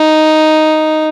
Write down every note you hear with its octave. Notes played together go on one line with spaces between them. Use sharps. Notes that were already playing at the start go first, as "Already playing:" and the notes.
Already playing: D#4